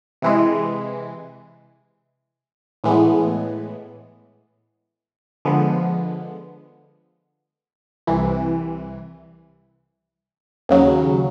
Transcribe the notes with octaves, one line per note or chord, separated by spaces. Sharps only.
C3 E3 G#3
A2 E3 G#3 B3
D3 F3 G#3 B3
C2 C3 E3
D#2 C#3 F#3